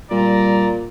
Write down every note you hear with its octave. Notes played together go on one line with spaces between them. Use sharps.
A#2 G3 D5 A#5